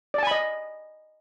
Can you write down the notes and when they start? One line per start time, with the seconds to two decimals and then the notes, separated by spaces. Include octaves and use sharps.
0.14 D5
0.18 A5
0.23 G#5
0.27 B5
0.31 D#5